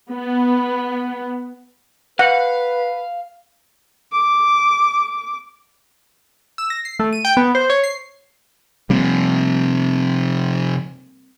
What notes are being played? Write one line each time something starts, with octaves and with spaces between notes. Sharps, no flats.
B3
B4 F5 F#5
D6
E6
A#6
C7
A3
D#7
G5
B3
C5
C#5
C7
C3 F3 G3 A#3 C4